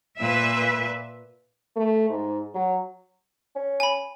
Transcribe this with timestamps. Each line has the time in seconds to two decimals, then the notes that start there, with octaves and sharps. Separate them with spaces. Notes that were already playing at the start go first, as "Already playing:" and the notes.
0.18 A#2 B4 E5
1.76 A3
2.09 G#2
2.54 F#3
3.56 C#4
3.80 G#5 B5